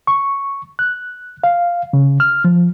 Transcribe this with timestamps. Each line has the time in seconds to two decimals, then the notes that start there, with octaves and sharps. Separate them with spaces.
0.07 C#6
0.79 F#6
1.44 F5
1.93 C#3
2.20 F6
2.44 F3